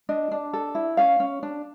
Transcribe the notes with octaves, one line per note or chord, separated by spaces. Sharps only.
D4 D#5
D4
A4
E4
C#4 F5
C#4
D4